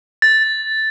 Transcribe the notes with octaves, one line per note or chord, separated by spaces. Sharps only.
A6